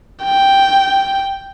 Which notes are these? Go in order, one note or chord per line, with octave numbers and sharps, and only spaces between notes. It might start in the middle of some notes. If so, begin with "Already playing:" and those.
G5